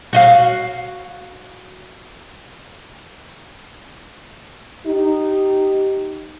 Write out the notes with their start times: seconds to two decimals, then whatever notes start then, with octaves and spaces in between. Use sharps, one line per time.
0.13 F#4 D#5 F5
4.86 D#4 G4